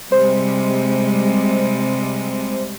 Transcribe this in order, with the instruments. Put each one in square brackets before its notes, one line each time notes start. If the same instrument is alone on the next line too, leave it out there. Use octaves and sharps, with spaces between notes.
[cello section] C3 G3 G#3 [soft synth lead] C5